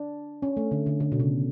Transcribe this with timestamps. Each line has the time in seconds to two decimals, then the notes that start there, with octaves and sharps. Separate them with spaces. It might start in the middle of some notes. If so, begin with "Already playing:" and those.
Already playing: D4
0.42 C#4
0.57 A3
0.72 D3
0.86 D3
1.00 D3
1.12 B2
1.19 C#3